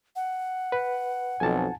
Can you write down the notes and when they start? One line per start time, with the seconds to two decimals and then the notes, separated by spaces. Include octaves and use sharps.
0.16 F#5
0.72 B4
1.40 B1 F2 G#5 A5